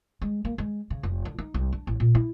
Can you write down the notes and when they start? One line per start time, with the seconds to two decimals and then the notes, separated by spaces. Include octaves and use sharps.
0.22 G#3
0.45 A#3
0.58 G#3
0.90 C#3
1.03 F1
1.25 D3
1.39 D#4
1.54 C2
1.72 D4
1.87 A1
2.00 A#2
2.15 E4